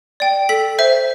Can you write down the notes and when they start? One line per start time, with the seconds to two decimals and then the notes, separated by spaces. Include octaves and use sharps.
0.20 D5 G5
0.49 A4 B6
0.79 C5 E5